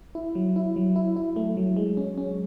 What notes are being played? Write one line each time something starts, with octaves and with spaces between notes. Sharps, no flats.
E4
F#3
E4
F#3
E4
E4
A3
F#3
G#3
C#4
C#4